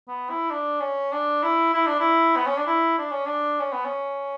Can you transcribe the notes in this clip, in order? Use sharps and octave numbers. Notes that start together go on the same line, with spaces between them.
B3
E4
D4
C#4
D4
E4
E4
D4
E4
B3
C#4
D4
E4
D4
C#4
D4
C#4
B3
C#4